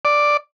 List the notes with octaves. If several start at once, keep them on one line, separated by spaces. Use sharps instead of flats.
D5